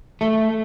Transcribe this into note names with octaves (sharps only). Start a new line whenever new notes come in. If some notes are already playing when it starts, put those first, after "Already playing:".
A3